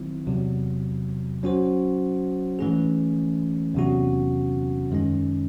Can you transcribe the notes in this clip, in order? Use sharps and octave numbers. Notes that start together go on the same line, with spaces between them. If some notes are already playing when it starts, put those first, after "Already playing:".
Already playing: D#3 F#3 C4 E4
E2 C3 F#3
F#3 C#4 F#4 C5
G#2 E3 A3 C#4 G#4
E2 C3 F#3 C#4 F#4
F#2 D#3 G#3 C#4